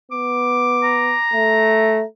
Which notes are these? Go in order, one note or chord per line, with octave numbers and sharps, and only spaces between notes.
B3 D6
A#5
A3